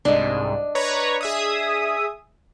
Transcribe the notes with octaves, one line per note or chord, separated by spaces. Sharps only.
C2 G#2 D4 D#5
B4 C#5 A#5
G#4 E5 D#6